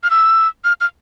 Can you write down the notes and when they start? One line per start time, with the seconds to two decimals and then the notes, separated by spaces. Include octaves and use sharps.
0.03 F6
0.11 E6
0.64 F6
0.81 F6